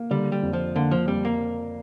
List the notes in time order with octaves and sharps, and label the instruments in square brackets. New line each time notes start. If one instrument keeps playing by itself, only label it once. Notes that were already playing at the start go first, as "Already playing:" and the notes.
Already playing: [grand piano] A#3
[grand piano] D3 [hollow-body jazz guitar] G3
[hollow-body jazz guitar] G3
[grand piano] F2
[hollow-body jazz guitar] F3
[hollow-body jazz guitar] D3 [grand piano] A#3
[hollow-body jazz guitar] F3
[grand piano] F2 [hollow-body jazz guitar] G3
[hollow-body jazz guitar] A#3